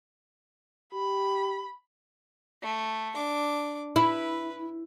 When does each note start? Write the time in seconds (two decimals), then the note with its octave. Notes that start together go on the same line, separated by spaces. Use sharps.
0.94 G4 B5
2.62 A3
3.15 D4 D6
3.96 E4 B4